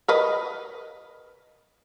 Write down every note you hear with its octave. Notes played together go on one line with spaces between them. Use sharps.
A#4 B4 D#5